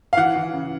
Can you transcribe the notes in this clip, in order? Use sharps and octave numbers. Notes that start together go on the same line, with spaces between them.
F5
E3 F#5
E3
C#3